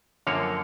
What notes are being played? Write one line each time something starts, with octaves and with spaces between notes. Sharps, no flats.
F#2 D3 F3 A#3 C#5